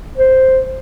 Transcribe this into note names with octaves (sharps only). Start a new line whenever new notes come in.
C5